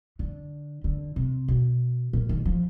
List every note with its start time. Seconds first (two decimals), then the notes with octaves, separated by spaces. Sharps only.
0.19 D3
0.84 D3
1.16 C3
1.48 B2
2.13 A#2
2.29 D#3
2.45 F3